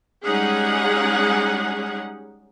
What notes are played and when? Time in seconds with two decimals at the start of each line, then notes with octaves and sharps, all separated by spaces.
0.24 G3 G#3 C#4 D#4 G#4 F#5